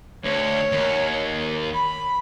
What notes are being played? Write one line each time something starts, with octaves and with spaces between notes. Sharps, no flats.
D2 C#5
D#2
B5